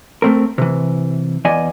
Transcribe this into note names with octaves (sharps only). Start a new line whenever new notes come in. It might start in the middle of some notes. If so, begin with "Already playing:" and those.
A3 C4 A#4
C3 E3
E2 D5 D#5 G#5